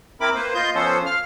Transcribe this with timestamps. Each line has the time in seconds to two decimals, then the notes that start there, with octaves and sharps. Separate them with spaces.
0.21 C4 E4 A#4 B5 D6
0.35 A#3 B4 C5
0.54 F4 D#5 C6 G6
0.75 F3 B3 C#4 A4 C5
1.05 F5 F6